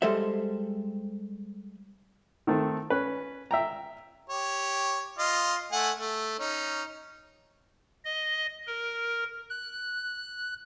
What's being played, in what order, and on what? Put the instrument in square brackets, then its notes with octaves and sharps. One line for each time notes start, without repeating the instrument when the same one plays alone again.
[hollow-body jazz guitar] G3 G#3 A4 C5 E5
[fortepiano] D#3 A3 C4
C#4 B4
E5 G5 A#5
[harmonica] G4 C#5
F4 D#5
A3 F#5 G#5
A3
C#4 D#4
[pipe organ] D#5
A#4
F#6